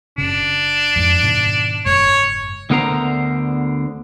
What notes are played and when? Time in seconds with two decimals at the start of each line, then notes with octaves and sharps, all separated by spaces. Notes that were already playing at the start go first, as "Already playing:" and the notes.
0.18 F#1 C#3 D4
0.96 F2 G#2
1.23 G#2 B2 D#3
1.85 F#1 G#2 C#5
2.70 D2 D3 B3 A#4 C5 A#5